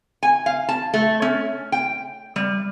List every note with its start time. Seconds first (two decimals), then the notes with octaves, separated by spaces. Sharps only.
0.23 G#5
0.46 F5
0.69 A5
0.94 A3
1.22 C#4
1.72 G5
2.36 G3